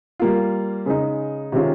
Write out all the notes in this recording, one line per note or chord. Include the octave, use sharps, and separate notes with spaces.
G3 A#3 F4
C#3 G#3 D#4
C3 D#3 G#3 C#4 F4